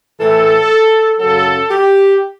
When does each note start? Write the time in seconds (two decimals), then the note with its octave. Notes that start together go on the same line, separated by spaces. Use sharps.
0.19 A2 E3 A4
1.19 F#2 C#3 F#3 A4
1.70 G4